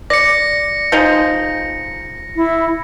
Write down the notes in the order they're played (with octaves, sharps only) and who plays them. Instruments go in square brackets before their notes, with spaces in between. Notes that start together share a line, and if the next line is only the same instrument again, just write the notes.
[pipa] D5 [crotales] A#6 C#7
[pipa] F3 G#3 D#4
[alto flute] E4